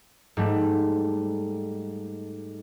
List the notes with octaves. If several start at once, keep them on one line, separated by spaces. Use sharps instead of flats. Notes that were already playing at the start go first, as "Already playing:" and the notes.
G#2 G3 A3